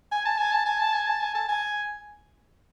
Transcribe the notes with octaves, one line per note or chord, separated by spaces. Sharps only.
G#5
A5
G#5
A5
G#5
A5
G#5
A5
G#5
A5
G#5